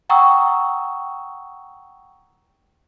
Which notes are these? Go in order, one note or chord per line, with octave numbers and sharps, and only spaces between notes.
F#5 G5 A#5 C#6 D#6 E6